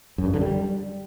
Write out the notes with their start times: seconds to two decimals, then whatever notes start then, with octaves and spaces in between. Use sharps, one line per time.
0.18 F#2
0.26 G2
0.34 D3
0.41 G3